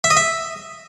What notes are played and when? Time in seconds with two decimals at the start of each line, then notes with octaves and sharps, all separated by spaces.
0.04 E5
0.10 D#5
0.17 E5